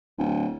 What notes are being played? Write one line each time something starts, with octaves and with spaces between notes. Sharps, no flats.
D1